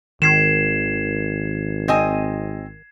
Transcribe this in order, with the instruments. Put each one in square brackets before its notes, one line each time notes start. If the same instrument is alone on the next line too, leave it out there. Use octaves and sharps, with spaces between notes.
[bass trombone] G#1 [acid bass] D#3 [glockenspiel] G#6 C7 E7
[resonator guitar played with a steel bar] C4 D#5 G#5